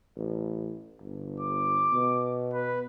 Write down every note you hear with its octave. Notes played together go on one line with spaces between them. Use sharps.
A1
G1
D6
B2
B4